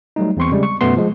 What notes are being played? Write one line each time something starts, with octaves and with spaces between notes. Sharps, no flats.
F#3 G3 A3 D#4
E2 C4 C6 C#6
C#3 G3 G#3
C#6
F#2 B2 A3 B3 C6
F3 G#3